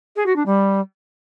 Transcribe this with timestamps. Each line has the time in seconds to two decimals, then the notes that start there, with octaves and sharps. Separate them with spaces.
0.16 G#4
0.26 F#4
0.36 D4
0.46 G3